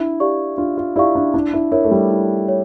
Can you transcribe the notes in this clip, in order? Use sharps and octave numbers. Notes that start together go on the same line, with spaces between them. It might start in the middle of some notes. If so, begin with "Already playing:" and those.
Already playing: D4 E4
G4 D5 F5 C#6
D4 F4
F4
E4 G4 D5 F5 C#6
D4
D4 E4
E4
E4 A#4 C#5
A3
G3
E4
C#5